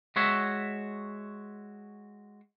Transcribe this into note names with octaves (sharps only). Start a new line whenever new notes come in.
G#3 F#4 C#5 E5